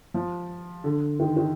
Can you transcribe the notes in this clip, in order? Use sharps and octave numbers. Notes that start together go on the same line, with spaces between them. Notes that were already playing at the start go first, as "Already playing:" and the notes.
F3
D3
D#3
D#3